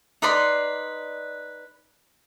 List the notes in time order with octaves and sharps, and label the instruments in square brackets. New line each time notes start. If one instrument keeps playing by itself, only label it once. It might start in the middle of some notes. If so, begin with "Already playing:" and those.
[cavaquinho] D#4 B4 D5 C6